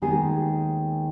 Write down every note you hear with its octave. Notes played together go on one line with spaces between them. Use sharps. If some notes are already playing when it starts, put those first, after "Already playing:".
D#2 D#3 G#3 B3 G#4